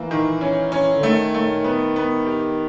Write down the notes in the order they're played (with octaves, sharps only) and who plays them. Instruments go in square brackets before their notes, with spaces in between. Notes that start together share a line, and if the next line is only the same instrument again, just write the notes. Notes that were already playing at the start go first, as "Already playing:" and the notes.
Already playing: [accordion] E3 [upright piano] A#3
[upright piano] D#3
C#4
C#4
[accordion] D3
[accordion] D#3 [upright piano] A3
[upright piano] A3
B3
B3
G4